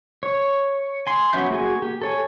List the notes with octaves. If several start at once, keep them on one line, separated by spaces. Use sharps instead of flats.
C#5
G#5 C6
F#3 B3 C#4 E5 G6
A#3 F#4 G#4 G#5
G4
A4 C#5 G#5